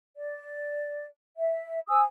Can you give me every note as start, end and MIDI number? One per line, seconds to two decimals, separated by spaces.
0.16 1.05 74
1.38 1.79 76
1.88 2.02 72
1.88 2.02 80
1.88 2.02 87
1.88 2.02 88